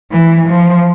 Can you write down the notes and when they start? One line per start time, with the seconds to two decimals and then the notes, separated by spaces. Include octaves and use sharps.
0.11 E3
0.48 F3